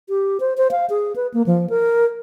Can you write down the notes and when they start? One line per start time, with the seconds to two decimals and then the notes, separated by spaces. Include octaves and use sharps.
0.09 G4
0.40 C5
0.57 C5
0.71 F5
0.90 G#4
1.16 B4
1.34 A#3
1.46 F3
1.70 A#4